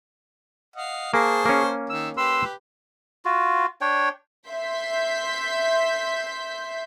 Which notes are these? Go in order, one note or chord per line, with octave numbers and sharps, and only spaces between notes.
D#5 F5 F#5
A#3 G#4 C5 A5 C#6
A#3 C#4
D#3 E6
G4 B4 C6 E6
F4 F#4
D4 C#5 G5
E5 C6 G6 B6